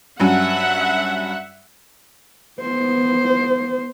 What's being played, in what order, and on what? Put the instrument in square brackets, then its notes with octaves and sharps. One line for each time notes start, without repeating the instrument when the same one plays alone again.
[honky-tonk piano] G2 F#3 C#4 [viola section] E5 F#5
[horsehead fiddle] B3 C5